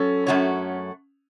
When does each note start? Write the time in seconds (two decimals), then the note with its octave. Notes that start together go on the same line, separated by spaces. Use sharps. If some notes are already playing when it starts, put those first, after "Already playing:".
Already playing: F#3 C#4 A4
0.27 F#2 E3 A3 F#4 C#5